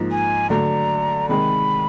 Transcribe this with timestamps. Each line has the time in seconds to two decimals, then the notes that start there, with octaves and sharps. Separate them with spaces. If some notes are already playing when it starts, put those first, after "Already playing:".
Already playing: G#2 F3 A#3 D#4
0.11 G#5
0.50 D3 F#3 A3 A#5
1.29 C3 D#3 G#3 B5